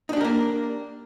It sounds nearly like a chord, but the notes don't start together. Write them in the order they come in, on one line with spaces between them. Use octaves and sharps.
D#4 D4 G4 A#4 A#3